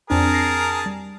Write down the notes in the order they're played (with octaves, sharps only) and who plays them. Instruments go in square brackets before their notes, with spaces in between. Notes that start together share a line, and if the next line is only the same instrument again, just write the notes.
[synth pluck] F2 C4 D4 [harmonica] G#4 A#4 A5
[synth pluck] A#6 C7
G3